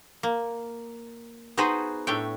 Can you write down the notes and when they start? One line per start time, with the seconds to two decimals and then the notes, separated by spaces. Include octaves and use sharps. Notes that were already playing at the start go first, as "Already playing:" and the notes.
0.23 A#3
1.57 B3 D#4 F#4 G#4 B4 C5
2.07 A2 A3 D4 G4 C#5 G5